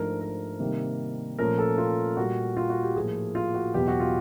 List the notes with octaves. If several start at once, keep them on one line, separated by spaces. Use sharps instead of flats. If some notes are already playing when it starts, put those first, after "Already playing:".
Already playing: G#2 F3 A3 D4 A#4
A#4
C3 D#3 G3 A#3
A#2 F3 A3 C#4 A#4
A4
F4
A#2 G3 A#3 F#4
F4
F#4
G4
A2 F3 A#3 G#4
F4
F#4
E2 B2 F#3 B3 G4
F#4
F4